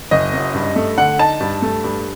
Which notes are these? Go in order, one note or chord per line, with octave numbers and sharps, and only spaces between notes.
F#1 D#5
F#2
G2
A3
D3 F#5
D#4 A5
G2
A3
G2